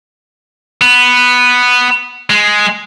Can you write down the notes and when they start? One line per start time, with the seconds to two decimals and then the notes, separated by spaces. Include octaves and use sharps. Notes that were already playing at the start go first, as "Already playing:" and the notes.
0.81 B3
2.30 G#3